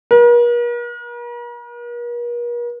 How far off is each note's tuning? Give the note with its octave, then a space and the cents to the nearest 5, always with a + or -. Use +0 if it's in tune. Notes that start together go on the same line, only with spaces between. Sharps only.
A#4 +45